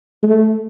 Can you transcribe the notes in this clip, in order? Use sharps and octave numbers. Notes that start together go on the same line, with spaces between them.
A3